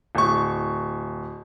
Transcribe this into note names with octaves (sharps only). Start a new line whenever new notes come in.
D1 C#6